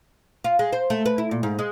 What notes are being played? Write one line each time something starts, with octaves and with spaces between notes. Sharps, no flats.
F4
G#3
C5
A3
B4
E4
A#2
G#2
G#3